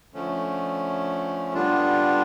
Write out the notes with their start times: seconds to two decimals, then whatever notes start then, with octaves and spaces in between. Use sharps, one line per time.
0.14 D3 F3 A3 C#4
1.54 D3 G3 B3 D4 F4